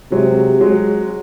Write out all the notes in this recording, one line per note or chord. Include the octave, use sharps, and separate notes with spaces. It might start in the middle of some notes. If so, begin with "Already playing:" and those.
C3 F#3 G#3
F#3 G#3